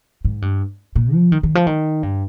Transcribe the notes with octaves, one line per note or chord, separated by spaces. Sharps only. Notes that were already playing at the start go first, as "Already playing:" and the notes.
G#2
G2
A#2
F3
D#3
D#3
F3
D#3
G2